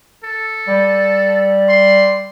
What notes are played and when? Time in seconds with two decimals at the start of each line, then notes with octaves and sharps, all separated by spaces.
0.24 A4
0.68 G3
1.69 C6